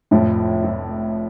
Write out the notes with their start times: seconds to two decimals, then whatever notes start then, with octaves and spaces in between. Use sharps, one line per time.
0.11 F1 F2 A2 F3
0.64 F1 F2 F3